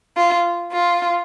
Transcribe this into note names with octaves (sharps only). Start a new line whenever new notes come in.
F4
F4